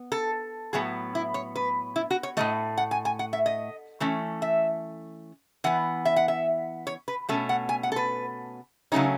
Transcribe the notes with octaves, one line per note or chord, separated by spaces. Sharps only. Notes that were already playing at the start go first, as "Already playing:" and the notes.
Already playing: B3
A4
A2 F#3 B3 G#4
E4
C#5
B4
E4
F#4
C#5
A2 F#3 A3 D#5
F#5
G#5
G#5
F#5
E5
D#5
E3 A3 C#4
E5
E3 B3 F#5
E5
F#5
E5
C#5
B4
B2 A3 C#4 A4
F#5
G#5
F#5
A4
B4
C#3 F#3 A3 C#4 D#4